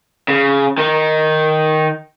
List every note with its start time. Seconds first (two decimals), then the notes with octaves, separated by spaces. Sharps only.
0.28 C#3
0.78 D#3 D#4